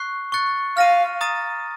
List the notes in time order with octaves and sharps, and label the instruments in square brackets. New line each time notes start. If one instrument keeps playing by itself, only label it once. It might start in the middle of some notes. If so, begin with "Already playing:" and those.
Already playing: [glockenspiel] C#6 F#6 C7
C#6 F#6 A6 C#7
[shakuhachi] F5 [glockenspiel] F6 A#6 D#7
[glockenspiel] A#5 D#6 A6 D#7